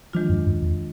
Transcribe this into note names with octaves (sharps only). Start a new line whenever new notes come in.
D#3 F3 G#3 D4 F4
F#2
F#2
F2